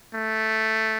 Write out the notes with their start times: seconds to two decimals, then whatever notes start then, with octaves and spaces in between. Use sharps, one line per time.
0.14 A3